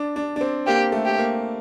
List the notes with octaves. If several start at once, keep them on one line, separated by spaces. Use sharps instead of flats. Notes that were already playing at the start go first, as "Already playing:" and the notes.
Already playing: D4
D4
D4
C4
A#3 G4
A3
G4
A#3